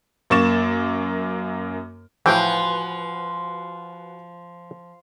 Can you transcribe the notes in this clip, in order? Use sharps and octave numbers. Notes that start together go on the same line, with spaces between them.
F#2 A#3 C#6 A6 E7
A2 E3 F3 F#4 B4 G5 G#5